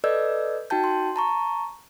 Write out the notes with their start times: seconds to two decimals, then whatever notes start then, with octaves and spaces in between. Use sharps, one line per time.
0.04 A4 B4 D5 D#5 E6 G6
0.70 D#4 F#4 G5 A5 G6
0.84 C6
1.16 A5 A#5 C#6